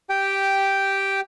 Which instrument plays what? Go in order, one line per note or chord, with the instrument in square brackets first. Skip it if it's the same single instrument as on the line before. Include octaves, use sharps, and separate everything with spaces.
[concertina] G4 G5